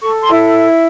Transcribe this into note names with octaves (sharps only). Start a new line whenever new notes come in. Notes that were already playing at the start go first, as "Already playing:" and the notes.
A4 C#6
C6
E4